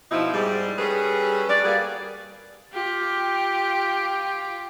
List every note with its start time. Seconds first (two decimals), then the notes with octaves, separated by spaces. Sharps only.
0.11 B2 F3 D#4 E4
0.34 G#2 G3
0.78 G3 C#4 G#4 A4 B4
1.49 G3 D5
1.64 G3 A#3 F#4 G#4
2.73 F4 G4